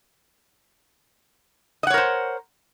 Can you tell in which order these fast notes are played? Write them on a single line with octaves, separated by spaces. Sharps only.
D#5 F#5 C#5 A#4 C5